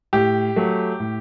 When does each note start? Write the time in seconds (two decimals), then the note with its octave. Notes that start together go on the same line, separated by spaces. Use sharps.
0.13 A2 G4
0.56 F#3 A3
1.00 A2